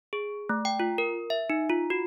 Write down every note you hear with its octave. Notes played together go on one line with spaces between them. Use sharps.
G#4
A3
G5
F4
A#4
E5
D#4
F4
F#4